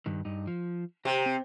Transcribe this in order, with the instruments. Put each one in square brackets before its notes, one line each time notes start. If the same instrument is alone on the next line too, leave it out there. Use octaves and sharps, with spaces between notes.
[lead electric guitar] G2 D#3
G2 D#4
F3
[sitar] C3 [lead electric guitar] G4 A#5
[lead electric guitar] C4